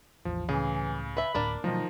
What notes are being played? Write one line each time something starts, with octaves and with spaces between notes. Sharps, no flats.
A1 E2 F3
C#2 A2 C#3 E3 G#4
B4 E5 B5
D1 A2 A#3 D4 D5
B2 D#3 F3 F#3 A3 D#4